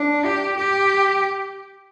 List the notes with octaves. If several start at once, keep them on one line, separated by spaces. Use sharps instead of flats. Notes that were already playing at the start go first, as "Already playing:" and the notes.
Already playing: D4
G4
G4